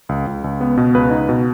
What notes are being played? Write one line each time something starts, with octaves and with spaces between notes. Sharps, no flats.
C#2
C#2
C#2
B3
B2
C#2 B4
D#4
B2